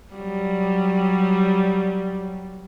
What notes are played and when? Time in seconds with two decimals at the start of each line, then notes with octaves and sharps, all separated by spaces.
0.14 F#3 G3